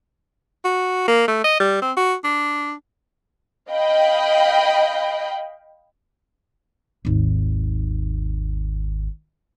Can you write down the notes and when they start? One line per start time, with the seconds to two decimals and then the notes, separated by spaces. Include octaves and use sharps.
0.64 F#4
1.08 A#3
1.28 A3
1.44 D#5
1.60 G3
1.82 C4
1.97 F#4
2.24 D4
3.70 D#5 F5 G5 B5
7.05 G#1 D#2